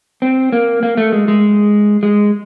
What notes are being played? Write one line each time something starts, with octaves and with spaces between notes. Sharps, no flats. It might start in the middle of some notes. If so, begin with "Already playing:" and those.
C4
A#3
A#3
A3
G#3
G#3
G#3